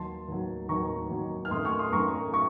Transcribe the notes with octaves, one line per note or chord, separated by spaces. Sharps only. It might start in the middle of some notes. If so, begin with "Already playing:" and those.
Already playing: D#2 D#3 F#3 A5 C6
D#2 D#3 F#3
D#2 D#3 F#3 A#5 C#6
D#2 D#3 F#3
F6
F#2 D#3 A3 C6 D#6
C#6 F6
C6 D#6
F#2 D#3 A3 A#5 C#6
A3 A#5 C#6